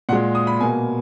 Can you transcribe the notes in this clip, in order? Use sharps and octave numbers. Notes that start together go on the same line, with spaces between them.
A#2 G#3 F#5
D#6
B5
B2 A#3 G#5